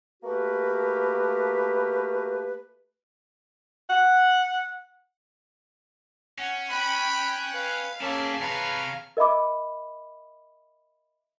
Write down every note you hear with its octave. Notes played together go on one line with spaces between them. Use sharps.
A3 A#3 F#4 G4 A#4 B4
F#5
C#4 F#5
G5 B5 F#6
B4 F5
F#3 A#3 C#4 G#4 E5 A5
C3 B4 C#5 F5 A#5 F6
A#4 D#5 E5 B5 D6